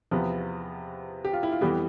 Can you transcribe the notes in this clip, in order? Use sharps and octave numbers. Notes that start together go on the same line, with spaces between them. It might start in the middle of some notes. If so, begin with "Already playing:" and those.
E2 C3 F3 B3
G4
F4
E4
F4
F2 E3 G3 B3 G4